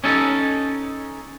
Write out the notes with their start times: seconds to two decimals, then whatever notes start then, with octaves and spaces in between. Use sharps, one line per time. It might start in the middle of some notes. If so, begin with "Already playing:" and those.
0.04 C#4 D#4 A4